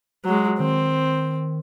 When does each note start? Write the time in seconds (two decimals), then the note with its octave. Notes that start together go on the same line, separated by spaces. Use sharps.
0.25 F#3 G#3
0.60 D#3 C4